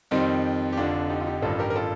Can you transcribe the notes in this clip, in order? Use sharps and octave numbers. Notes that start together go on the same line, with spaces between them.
F2 D#3 G3 C4 D#4
G4
F1 F2 D3 D4 F4
D#4 G4
F4
D#4 G4
A1 G2 D#3 F4 A4
G4 A#4
A#4
F4 A4